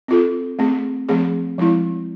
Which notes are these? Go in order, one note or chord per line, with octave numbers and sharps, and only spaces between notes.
C4 F4 A4
A3 C4 G#4
F3 A3 C4 G#4
F3 G#3 C4 E4